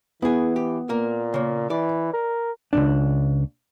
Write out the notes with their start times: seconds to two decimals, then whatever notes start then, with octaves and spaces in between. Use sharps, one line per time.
0.22 E3 B3 E4 G#4
0.56 G4
0.89 A#2 A#3 A#4
1.34 C#3 A#3
1.70 E3 D5
2.13 A#4
2.73 C#2 G2 D4